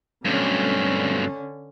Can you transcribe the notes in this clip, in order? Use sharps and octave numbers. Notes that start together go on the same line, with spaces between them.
G2 B2 D3 F#3 A3 C4 C#4